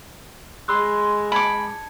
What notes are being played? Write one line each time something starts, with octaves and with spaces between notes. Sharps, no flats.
G#3 B5 C6 E6 F#6
A5 B5 D6 G#6 C#7